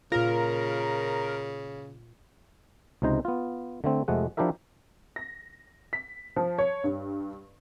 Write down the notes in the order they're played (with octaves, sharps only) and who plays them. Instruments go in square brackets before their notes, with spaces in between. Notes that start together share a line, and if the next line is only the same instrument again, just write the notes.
[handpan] A#2 F4 [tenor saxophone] C#3 [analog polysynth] A#4
[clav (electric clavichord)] C#2 C3 D#4 C5 A#5
B3 F4
D3 A3 C4
F2 C3 G#3 A3 F#5
F3 D4 E4 G4 A#4 E5
[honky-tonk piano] A#6
B6
F3
C#5
G2